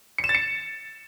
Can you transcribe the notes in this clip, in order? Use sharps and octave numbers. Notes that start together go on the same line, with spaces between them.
C#7
E7
A6
C#7